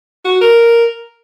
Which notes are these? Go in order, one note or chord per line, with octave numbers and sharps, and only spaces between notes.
F#4
A#4